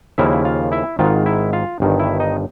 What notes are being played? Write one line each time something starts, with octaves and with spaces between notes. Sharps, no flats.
D#2 C#3 F3 A#3 C#4 E4 E5
F4 F5
E4 E5
G#1 G#2 D#3 F4 F5
E4 E5
F4 F5
G1 G2 D#3
E4 E5
D#4 D#5